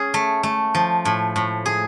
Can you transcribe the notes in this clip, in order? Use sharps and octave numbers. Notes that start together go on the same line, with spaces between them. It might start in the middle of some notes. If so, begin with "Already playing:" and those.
Already playing: C#4 G#4
A3
A3
F3
A2
A2
G#4